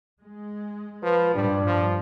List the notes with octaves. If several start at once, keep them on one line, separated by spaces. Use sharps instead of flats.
G#3
F3 B4
G2 A#2 G3 D4
F3